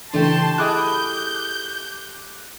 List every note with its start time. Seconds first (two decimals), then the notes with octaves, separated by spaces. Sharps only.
0.14 C#3 E3 A3 D4 G4 A5 C6
0.58 E4 G#4 D#5 D6 F#6 G6